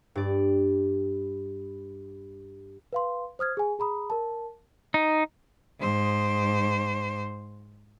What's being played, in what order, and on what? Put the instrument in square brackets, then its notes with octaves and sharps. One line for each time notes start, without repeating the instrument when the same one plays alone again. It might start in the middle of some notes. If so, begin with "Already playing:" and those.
[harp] G2 D5
[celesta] B4 F5 C6
C5 D#6 F6 G#6
G#4 G#5
G#4 A#5 B5 D#6
A#4 A5
[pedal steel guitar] D#4
[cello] G#2 C5